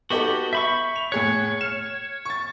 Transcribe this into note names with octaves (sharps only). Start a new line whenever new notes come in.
B3 D#4 F#4 G4 A4
E5 B5 C#6 G6
F7
A2 G#4 C#5 F#6
F6 E7
C#6 A6